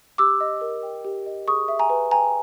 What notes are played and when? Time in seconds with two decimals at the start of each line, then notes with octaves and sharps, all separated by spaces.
0.18 G4 D6 E6
0.40 D#5
0.61 A#4
0.83 G5
1.05 G4
1.26 D#5
1.47 G#4 C#6 D#6
1.68 E5
1.79 G#5 A#5
1.90 B4
2.11 G5 G#5 A#5